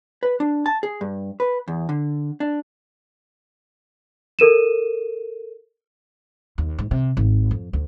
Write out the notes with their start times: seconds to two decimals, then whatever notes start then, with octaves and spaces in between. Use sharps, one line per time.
0.23 B4
0.40 D4
0.66 A5
0.83 G#4
1.01 G2
1.40 B4
1.68 E2
1.89 D3
2.40 D4
4.39 A4 A#4 D#7 E7
6.58 D#2
6.79 G#2
6.91 C3
7.17 G#1
7.51 F2
7.73 D2